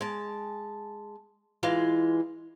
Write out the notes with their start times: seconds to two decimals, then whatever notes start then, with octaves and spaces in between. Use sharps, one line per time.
0.01 G#3 A5
1.63 E3 G#3 F4